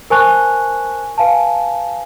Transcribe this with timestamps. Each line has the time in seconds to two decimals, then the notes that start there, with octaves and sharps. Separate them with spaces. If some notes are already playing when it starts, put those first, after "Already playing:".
0.10 A#4 C5 G#5 A5 C#6 F#6
1.18 B4 F5 G#5 A5